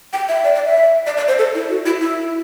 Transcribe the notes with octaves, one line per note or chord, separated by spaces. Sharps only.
G5
E5
D5
D5
E5
D5
D5
C5
A4
E4
F#4
E4
E4